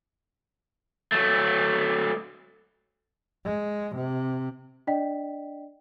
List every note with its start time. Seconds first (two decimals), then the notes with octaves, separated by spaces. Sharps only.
1.12 F#3 A3
3.45 G#3
3.96 C3
4.87 D4 D5 D#5 G5 B6